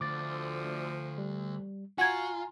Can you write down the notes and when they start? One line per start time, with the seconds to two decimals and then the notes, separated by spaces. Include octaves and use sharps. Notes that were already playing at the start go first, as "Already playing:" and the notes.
0.01 D2 F3 D6 A6
1.18 G3
1.98 F4 F#4 F#5 G#5 A#5 G#6